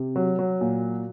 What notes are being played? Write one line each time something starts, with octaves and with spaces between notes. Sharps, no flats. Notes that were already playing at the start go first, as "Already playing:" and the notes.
Already playing: C3
F#3
F#3
A#2